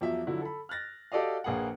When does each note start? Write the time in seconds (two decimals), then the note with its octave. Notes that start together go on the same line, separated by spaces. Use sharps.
0.01 E2 F3 F#3 E5
0.27 D3 F3 F#3 E4 F#4
0.41 A4 B5
0.69 F6 F#6 A6 A#6
1.12 F#4 G4 A4 D5 D#5 F5
1.44 A#1 A#3 G#4 B4 F#5